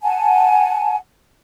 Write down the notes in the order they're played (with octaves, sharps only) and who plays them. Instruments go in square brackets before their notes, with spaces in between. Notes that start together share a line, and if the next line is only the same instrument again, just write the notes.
[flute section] F#5 G#5 A5